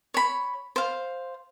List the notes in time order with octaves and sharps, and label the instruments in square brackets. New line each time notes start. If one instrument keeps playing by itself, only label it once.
[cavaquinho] C#5 B5
C5 F5